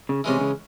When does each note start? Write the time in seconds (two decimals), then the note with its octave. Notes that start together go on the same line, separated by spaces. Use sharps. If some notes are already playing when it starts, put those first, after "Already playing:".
0.09 C#3
0.24 C3 E3 G#3 C#4
0.41 C#3